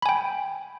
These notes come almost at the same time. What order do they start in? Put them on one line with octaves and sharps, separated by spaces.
B5 G#5 G5